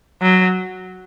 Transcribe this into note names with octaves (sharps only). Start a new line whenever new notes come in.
F#3